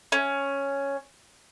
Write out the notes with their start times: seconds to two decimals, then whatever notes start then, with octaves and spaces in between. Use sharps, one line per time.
0.12 C#4